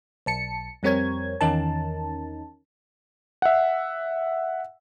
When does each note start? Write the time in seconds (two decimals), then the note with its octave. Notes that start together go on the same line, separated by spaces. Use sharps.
0.26 B1 A5 C#7
0.83 F2 G3 C4 A#4 C#5 G#6
1.41 E2 D#3 C#4 D#4 A#4 A5
3.42 E5 F#5